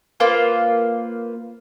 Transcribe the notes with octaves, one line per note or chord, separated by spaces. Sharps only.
A#3 F4 B4 C5